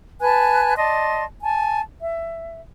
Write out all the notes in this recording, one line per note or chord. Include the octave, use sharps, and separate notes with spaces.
B4 G#5 A5 F#6
D5 D#5 A5 C6
G#5 A5
E5